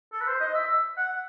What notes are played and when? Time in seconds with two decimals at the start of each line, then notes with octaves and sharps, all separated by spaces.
0.13 A4
0.21 B4
0.27 C5
0.40 D#5
0.54 E5
0.98 F#5